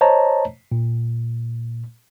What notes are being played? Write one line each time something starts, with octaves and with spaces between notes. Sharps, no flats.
C5 C#5 D#5 A5 A#5
A#2